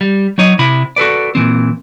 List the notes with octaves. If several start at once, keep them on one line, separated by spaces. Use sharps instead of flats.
G3
F#3 D#4 C#5 D#5
C3 E4 B5
F#4 A4 B4 D5
A#2 E3 C4